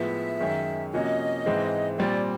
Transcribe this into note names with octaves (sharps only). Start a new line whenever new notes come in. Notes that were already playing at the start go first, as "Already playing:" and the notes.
Already playing: A2 F3 G#3 B3 E5
F#2 D#3 G#3 C#4
C3 F3 A#3 C#4 F#4 D#5
G#2 E3 G#3 C4
A#2 G3 C4 D5